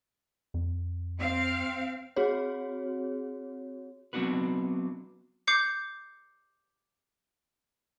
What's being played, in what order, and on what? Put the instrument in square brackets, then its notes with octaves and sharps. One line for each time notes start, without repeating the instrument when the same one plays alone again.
[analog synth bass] F2
[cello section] C4 F5
[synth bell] C4 F#4 G#4 C#5
[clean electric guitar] F#3 B3 C4 D4 F#4 B4
[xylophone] D6 G6 C7 C#7